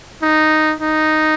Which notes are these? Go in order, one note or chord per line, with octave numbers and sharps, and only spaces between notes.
D#4
D#4